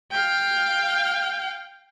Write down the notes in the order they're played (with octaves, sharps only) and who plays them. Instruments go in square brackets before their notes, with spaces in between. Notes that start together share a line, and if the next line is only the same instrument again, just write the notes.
[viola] F5 G5